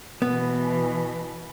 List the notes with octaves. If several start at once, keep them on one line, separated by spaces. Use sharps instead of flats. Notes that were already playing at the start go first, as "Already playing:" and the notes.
B2 E3 B3